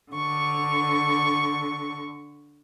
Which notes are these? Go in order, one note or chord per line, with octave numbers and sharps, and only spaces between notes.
D3 C#6